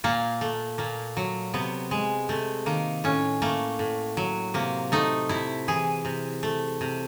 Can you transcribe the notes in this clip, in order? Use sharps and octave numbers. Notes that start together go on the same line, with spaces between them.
A#2 A#3
A3
A#2 A#3
F#3
C3 B3
G#3
C3 A3
D#3 A#3
A2 C#4
A3 A#3
A2
F#3
C3 A#3
A3 D#4
C3 E4
E3 G#4
C3
A3
C3